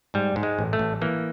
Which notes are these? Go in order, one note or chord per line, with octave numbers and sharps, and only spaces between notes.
G#2 G3
G#2
G#3
A1
A3
A1
E3 A#3